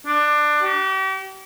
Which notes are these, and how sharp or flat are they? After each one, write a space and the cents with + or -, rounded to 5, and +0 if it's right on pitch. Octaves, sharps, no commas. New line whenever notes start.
D4 +20
G4 -40